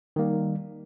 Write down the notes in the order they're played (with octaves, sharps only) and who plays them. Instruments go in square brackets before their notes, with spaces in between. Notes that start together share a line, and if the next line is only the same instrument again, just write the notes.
[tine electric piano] D#3 G3 A#3